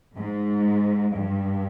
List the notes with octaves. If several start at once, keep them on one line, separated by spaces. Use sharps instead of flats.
G#2
G2